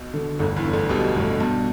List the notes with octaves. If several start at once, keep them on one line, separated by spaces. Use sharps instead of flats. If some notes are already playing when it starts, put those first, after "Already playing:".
Already playing: B1 B2
D3
G1 D2 D3
E2 E3
G1
D2 D3
B1 B2 G3
G1 A2
G2 B2